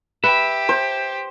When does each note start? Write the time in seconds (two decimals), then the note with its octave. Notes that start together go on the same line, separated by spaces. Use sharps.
0.24 G4 B4 E5
0.69 C5